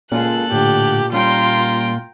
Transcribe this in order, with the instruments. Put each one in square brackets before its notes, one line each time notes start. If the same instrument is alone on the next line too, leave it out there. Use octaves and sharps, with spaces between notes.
[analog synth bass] A#2 [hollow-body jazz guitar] C#4 F4 G#4 [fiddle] A4 F#6
[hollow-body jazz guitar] A2 D3 [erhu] G4
[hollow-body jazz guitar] G3 C#4 [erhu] F4 [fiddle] G5 A#5